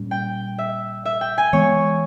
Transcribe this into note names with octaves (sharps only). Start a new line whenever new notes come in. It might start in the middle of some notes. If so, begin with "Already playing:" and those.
Already playing: A#2 G3 C#4
G5
E5
E5
G5
G#5
E3 G#3 B3 C#5